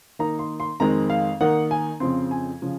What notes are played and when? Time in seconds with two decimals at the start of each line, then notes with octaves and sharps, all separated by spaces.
0.19 D#3 A#3 D#4 A#5
0.39 C6
0.60 C6
0.80 F2 D#3 G#3 C4 D#4 A#5
1.10 F5
1.41 D#3 A#3 D#4 F#5
1.71 G#5
2.00 F2 C#3 F3 C4 C6
2.31 G#5
2.62 C#3 F3